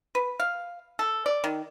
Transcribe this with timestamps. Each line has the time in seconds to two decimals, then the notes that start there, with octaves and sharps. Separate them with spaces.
0.15 B4
0.40 F5
0.99 A4
1.26 D5
1.44 D#3